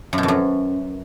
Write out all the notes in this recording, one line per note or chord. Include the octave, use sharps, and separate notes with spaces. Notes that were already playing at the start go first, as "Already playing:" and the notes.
F#2
B2
F2
F#2